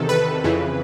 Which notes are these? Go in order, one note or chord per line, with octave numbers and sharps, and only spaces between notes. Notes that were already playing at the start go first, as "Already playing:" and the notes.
Already playing: E2 C3 D#3 A4
B4
F2 C#3 E3